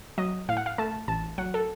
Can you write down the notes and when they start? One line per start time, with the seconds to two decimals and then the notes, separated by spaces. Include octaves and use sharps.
0.18 F#3 D#5
0.49 A2 F5
0.57 F#5
0.66 F5
0.78 A3 A5
1.08 A1 A5
1.38 F#3 F#5
1.54 A4